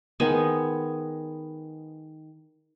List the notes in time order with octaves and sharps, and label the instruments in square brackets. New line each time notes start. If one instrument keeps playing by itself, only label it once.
[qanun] D#3 G#3 B3 G#5